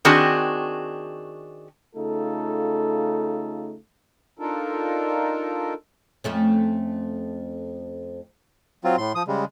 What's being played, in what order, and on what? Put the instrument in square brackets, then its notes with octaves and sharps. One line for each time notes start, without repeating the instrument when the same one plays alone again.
[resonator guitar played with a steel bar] D#3 C4 D4 F#4 G#4
[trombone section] C#3 A3 D#4 F4 A4
[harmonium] D4 D#4 F4 A4 A#4
[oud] F2 A3 C#4
[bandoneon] F#3 C4 F4
A2 C6
F3 D#6
C#3 G3 G#3